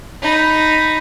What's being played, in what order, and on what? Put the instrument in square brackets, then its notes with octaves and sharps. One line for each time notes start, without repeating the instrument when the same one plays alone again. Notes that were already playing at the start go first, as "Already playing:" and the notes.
[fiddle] D#4 B5